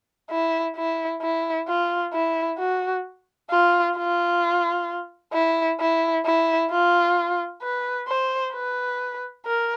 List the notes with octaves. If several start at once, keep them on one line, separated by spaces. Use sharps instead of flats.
E4
E4
E4
F4
E4
F#4
F4
F4
E4
E4
E4
F4
B4
C5
B4
A#4